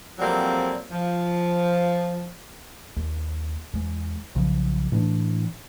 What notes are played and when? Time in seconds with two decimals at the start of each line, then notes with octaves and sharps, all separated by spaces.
0.19 F2 F#3 G3 A#3 C4
0.91 F3
2.96 D#2
3.73 E2 G#3
4.35 B1 C#3 F3
4.92 A2 E3 C4 D4